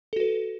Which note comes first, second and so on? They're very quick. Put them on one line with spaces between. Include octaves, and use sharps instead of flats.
A4 F#4 B4